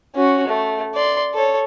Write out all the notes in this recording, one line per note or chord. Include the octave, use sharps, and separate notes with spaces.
C#4 F#4
A3
D5 C6
A4 C#5